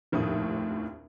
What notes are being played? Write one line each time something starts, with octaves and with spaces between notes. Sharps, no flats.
F1 A#1 D#2 A2 A3 D#6